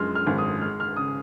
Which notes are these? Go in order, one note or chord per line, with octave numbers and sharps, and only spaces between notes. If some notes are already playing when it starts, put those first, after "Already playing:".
Already playing: F#2 F3 G#3 C6 F6
F6
G#1
D#6
G#3 F6
F6
C#3 D#6